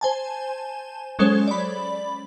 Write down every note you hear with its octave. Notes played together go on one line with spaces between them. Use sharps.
C5 G#5 A5
F#3 G#3 C#4 A4 C5 C#5
D5 B5